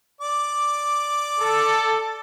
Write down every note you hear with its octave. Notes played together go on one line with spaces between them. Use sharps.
D5 D6
A4